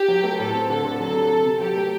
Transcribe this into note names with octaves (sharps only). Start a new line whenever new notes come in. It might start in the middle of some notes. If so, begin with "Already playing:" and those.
Already playing: G4
F#3
A3
A2 A4
C4
D3 A4
D3
F#3 A4
C3
C3
C3
F#3 G4
A3